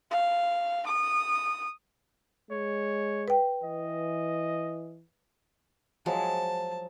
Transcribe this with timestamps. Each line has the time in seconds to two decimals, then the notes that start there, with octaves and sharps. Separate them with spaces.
0.11 F5
0.87 D#6
2.51 G#3 C#5
3.28 B4 G5
3.63 E3 D#5
6.06 F3 F#3 G#3 A5